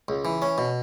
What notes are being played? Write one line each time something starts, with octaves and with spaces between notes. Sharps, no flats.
C#2
E3
C#4
B2